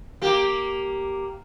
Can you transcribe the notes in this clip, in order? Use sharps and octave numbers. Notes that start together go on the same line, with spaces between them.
A#3 G4